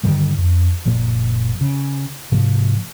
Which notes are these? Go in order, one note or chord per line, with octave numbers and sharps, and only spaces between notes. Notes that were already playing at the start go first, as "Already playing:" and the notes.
G2 D3 D#3 G3
F2
F#1 A#2 F3 A#3
C#3
G#2 C3 F3 A#3